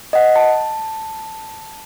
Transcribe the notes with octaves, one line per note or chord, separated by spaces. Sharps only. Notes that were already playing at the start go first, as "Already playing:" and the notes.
D#5 F#5
A5